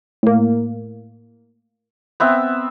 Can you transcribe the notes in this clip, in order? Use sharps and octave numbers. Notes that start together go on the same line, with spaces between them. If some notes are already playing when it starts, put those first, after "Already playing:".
A2 A#3
B3 C4 E5